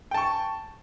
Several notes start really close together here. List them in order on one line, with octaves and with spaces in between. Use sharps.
G5 A5 C#6